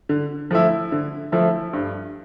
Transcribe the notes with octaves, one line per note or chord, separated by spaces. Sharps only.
D3
F3 A3 E4
D3
F3 A3 E4
G2